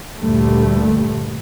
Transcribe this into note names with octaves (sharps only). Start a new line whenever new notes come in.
D2 G2 A#2 D3 G3 A3